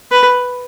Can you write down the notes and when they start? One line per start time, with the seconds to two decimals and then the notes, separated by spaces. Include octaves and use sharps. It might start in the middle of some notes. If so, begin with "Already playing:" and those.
0.12 B4